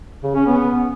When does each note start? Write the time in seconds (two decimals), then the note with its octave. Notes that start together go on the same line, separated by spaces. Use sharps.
0.23 C#3
0.35 C#4
0.47 B3